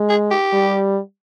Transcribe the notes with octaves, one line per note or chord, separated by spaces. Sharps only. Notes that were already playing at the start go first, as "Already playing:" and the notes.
Already playing: G#3
G#4
G4
G3